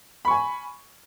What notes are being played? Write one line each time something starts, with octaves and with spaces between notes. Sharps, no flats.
G#5 B5 C#6